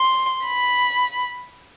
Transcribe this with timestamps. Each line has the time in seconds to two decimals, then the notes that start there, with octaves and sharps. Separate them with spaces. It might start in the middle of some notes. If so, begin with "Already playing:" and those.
Already playing: C6
0.45 B5